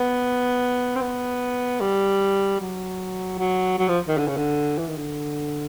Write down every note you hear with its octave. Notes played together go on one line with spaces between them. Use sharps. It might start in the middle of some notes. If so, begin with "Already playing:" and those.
Already playing: B3
C4
B3
G3
F#3
F#3
F#3
F3
D#3
D3
C#3
D3
E3
D#3
D3